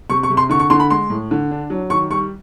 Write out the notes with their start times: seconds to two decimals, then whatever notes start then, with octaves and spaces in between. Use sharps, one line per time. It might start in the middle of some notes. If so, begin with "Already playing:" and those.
0.10 C3 C#6
0.23 C#6
0.30 C3
0.37 C6
0.49 D3 C#6
0.60 C#6
0.70 D3 C6
0.80 B5
0.90 G#3 C6
1.10 A2
1.31 D3
1.51 D4
1.70 F#3
1.90 D#3 C#6
2.11 G3 C#6